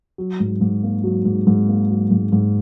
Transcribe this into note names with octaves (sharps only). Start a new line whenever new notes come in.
F#3
G#2
G#2
A#3
F#3
G#2
G#2
A#3
F#3
G#2
G#2